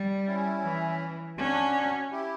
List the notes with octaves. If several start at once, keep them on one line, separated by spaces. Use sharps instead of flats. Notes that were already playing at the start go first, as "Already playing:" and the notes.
Already playing: G3
C#4 E4
E3
C#4 D4 F#4
E4 G4